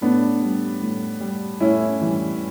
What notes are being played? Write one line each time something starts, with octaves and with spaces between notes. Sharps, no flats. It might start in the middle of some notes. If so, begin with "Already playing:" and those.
A2 B3 D4
G3
A2
G3
A2 C#4 E4
E3 G3